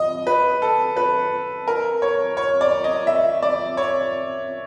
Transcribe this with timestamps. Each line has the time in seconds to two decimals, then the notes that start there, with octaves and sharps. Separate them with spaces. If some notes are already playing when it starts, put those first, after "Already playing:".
Already playing: D#5
0.27 B4
0.62 A4
0.97 B4
1.67 A#4
2.02 C#5
2.37 C#5
2.61 D5
2.84 D#5
3.07 E5
3.42 D5
3.77 C#5